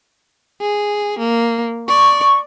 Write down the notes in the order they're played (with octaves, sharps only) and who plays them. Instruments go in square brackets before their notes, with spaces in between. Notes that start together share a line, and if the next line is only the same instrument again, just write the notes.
[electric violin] G#4
A#3
[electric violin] D5 [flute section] C#6